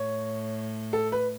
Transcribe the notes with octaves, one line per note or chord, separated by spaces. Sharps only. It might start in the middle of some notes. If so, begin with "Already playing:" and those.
Already playing: A2 C#5
A4
B4